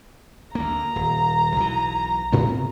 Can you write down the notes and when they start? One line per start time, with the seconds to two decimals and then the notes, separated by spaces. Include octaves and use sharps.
0.55 D2 A#3 A#5
0.96 D#1
1.56 B1 E3
2.32 A2 C3 B3